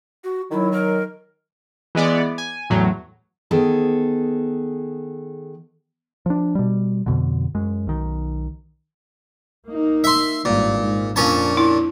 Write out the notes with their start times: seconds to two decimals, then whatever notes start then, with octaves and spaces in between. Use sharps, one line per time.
0.24 F#4
0.51 D#3 F#3 E4
0.72 A#4
1.95 E3 G#3 B3 D5
2.38 G#5
2.70 E2 A2 F#3
3.51 D#3 B3 G#4 A4
6.26 F3 D4
6.55 B2 G3
7.06 F2 B2 D3
7.55 F#2 G#3
7.87 B1 D#3
9.67 A#3 D#4
10.04 E5 C6
10.45 G#1 G2 A#2
10.79 G#2
11.16 F2 A#2 C#4 D4 A5
11.57 E4